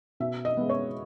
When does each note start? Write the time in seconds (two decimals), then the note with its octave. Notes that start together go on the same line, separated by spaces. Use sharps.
0.20 B2 E5
0.45 D#5
0.57 G#3 B3
0.70 C#5